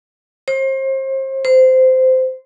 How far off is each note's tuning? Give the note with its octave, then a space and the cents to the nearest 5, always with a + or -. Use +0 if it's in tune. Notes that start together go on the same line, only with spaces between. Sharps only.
C5 +35
C5 -15